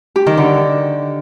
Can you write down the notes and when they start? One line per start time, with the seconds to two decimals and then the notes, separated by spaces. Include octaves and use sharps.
0.16 G4
0.26 D#3
0.37 D3